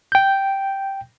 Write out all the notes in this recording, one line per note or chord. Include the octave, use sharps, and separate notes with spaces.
G5 G6